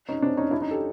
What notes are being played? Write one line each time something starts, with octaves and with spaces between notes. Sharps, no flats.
C#4 D#4
C4 D4
C#4 D#4
D4 E4
C#4 D#4
G4 A4